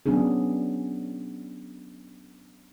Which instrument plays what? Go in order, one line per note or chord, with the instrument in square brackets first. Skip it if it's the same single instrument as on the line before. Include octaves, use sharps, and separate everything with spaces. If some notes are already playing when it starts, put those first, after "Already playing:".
[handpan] F#3 B3 C#4 D4 G#4